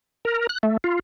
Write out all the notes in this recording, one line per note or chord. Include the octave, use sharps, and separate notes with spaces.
A#4
F#6
A3
F4